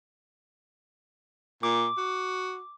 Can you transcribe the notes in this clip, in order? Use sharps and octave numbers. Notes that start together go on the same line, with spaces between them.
A#2 D6
F#4